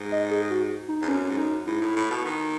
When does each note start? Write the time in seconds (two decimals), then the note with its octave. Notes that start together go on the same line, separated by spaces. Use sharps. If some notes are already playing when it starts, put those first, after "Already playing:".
Already playing: G#2
0.12 D#5
0.30 G#4
0.50 F#4
0.88 D#4
1.02 E2
1.08 F#2 C#4
1.30 G#2
1.37 F#2 D#4
1.66 G#2 E4
1.81 A2
1.96 A2
2.10 B2
2.25 D#3